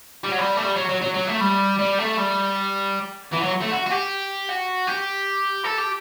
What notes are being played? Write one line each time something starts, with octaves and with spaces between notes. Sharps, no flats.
G3
F#3
G3
A3
G3
F#3
F#3
F#3
F#3
A3
G3
G3
A3
G3
E3
F#3
A3
F#4
F#4
G4
F#4
G4
A4
G4